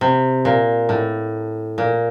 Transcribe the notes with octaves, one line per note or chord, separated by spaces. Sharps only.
C3
A#2
A2
A#2